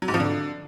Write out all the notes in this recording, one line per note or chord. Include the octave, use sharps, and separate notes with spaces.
F#3
G#2
F3
D3